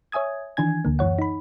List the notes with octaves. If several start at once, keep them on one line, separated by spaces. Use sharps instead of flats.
C#5 E5 G#5 D#6 G#6
D#3 E3 D4 G#5 G#6
D2 D3 A#3
F#2 E3 C#5 F#5
D#4 B5